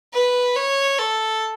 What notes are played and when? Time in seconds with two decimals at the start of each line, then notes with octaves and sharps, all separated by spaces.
0.13 B4
0.56 C#5
0.98 A4